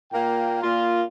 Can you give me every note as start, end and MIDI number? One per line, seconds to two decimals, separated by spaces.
0.12 0.60 46
0.12 0.60 58
0.12 0.60 79
0.63 1.03 46
0.63 1.03 65